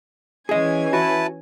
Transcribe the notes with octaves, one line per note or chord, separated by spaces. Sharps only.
E3 C#4 G#4 D#5 G#5
E4 F#4 B4 A5